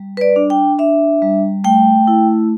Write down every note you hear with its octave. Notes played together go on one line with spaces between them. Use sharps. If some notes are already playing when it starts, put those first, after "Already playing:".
Already playing: G3
B4
D5
D4
G5
D4 E5
G3
A3 G5
E4